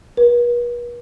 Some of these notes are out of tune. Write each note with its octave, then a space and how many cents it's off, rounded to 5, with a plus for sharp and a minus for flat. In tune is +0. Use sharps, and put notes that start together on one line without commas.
B4 -45